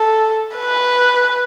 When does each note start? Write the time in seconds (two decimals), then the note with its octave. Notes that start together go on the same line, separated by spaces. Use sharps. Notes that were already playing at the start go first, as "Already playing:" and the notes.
Already playing: A4
0.56 B4